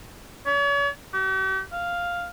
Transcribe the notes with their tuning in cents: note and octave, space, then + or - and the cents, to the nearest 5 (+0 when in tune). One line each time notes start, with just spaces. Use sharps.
C#5 +40
G4 -45
F5 +0